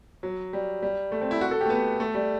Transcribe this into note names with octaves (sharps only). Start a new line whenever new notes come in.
F#3
G3
G3
A3
C4
E4
F#4
A4
G4
A3
B3
A3
G3